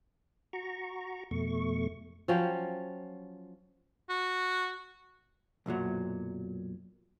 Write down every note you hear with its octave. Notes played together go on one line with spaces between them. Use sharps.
F#4 A#5 C#6
F2 B2 A3 C#6
F3 F#3 C#4 G5
F#4
B1 F#2 A#2 F#3